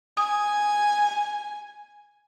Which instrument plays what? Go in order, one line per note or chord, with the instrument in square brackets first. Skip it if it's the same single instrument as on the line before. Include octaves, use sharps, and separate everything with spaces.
[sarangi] G#5 [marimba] D#6